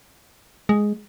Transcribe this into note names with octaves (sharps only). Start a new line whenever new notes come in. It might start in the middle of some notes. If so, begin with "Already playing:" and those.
G#3